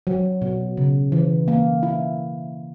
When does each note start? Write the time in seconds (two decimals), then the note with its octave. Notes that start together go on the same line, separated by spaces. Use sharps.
0.07 F#3
0.42 B2
0.77 C#3
1.12 E3
1.48 A#3
1.83 E4